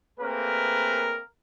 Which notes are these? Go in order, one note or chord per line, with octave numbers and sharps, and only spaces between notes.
A3 A#3 C4 G#4 A#4 B4